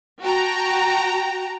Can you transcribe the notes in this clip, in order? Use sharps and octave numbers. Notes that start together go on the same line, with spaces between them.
F#4 G5 A5 A#5